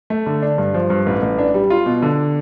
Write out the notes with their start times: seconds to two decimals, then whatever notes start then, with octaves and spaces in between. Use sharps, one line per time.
0.10 A3
0.26 D3
0.42 D4
0.58 G2
0.74 F3
0.90 G2
1.06 A1
1.22 A1
1.38 D4
1.54 G3
1.70 F4
1.86 B2
2.02 D3